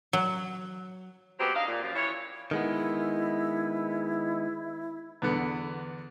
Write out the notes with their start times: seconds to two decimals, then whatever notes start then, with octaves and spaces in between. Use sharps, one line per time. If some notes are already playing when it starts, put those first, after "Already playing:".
0.13 F#3
1.40 F#3 G#3 B3 C4 G4
1.54 D4 D#4 D#5 F5
1.68 A#2
1.83 F#2 F3
1.96 E3 F4 C#5
2.51 D#3 G#3 B3 E4
5.22 E2 D3 B3